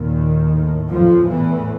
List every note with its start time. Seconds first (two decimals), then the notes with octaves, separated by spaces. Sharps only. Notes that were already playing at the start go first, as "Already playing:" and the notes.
Already playing: D#2 A#2 D#3
0.53 A2
0.91 F2 F3
1.30 E2 A2 E3